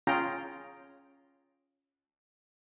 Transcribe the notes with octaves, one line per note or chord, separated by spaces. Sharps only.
C#4 F4 G#4 G5 A#5